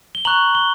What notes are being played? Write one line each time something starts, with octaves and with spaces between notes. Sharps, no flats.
G7
A#5 C#6 F#6 F#7
G7